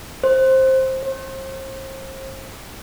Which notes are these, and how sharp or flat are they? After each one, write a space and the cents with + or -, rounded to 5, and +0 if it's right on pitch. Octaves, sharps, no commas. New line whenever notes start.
C5 +10
C5 +40